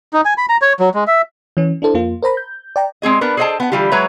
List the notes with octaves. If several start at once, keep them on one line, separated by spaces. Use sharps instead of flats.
D#4
G#5
B5
A#5
C#5
F#3
G#3
E5
E3 C#4
D4 E4 A4 C5
F2 A#3 F4
A#4 C5 A#5 B5
G6
D5 G5 A#5
G#3 C4 G#4 D#5
B3 D4 A#4 B4
G#4 A4 C5 D#5 G5 A5
B3 F#5
D3 E3 G3 F4 G4
F#3 G#3 B4 C#5 E5 A#5